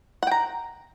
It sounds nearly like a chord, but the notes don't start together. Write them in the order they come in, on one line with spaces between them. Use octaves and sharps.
F#5 G5 A#5